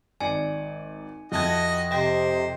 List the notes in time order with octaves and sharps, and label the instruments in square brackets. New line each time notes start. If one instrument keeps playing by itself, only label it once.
[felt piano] G#1 D5 C#7 [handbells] G#5
[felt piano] F2 A5 G#6 [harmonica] E4 F#4 D#5
[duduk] C3 [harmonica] C5 [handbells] D#5 G5 A#6